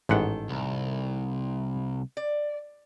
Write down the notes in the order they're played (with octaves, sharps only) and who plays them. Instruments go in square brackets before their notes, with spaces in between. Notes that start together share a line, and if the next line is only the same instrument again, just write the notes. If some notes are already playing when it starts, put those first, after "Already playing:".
[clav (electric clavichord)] A1 G#2 F#5 [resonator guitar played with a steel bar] D#3 A4
[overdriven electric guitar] C2
[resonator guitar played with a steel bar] D5